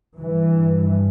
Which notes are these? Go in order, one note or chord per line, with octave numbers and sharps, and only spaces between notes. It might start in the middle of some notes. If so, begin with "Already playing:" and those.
G2 E3